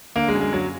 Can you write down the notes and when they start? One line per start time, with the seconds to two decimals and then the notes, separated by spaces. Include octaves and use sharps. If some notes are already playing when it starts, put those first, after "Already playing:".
0.16 D3 A#3
0.28 G#3
0.35 F#2
0.41 G#3
0.53 F#2 F#3